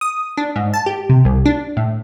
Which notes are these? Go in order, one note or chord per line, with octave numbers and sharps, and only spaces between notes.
D#6
D4
G#2
A5
G4
C3
C2
D4
A2